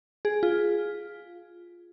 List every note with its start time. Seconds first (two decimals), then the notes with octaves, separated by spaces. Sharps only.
0.25 G#4
0.43 F4